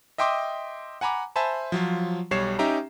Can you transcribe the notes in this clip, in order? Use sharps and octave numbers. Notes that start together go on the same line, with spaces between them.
D#5 E5 G5 C6 D6 D#6
F#5 G#5 A#5 B5 D6
C5 E5 G#5 A5 B5
F3 F#3 F4
B1 G3 C#5 C7 E7
C#4 D#4 G4 E5 G5 A#5